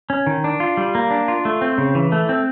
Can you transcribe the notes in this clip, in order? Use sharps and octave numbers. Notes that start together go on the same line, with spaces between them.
C#4
D#3
D4
F4
G3
A#3
D4
F4
A3
C4
C#3
E3
A3
C4